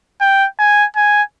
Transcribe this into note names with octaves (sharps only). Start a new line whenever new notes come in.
G5
G#5
G#5